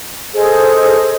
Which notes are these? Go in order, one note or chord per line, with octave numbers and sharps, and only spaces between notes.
G#4 A4 C5 D#5